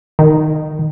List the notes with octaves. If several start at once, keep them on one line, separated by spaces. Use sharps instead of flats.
D#3